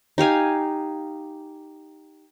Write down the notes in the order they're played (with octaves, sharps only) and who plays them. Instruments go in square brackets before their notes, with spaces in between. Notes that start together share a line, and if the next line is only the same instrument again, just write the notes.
[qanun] D#4 G4 F5 G#5